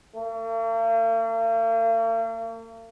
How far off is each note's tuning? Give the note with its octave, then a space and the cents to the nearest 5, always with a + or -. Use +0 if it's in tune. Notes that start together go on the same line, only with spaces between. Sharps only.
A#3 -45